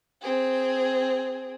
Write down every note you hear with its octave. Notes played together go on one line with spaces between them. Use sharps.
C4 G#4